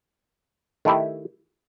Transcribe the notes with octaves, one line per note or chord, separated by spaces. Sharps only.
D#3 A3 E4 G4